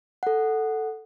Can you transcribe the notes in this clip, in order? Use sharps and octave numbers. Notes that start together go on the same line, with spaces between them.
A4 F#5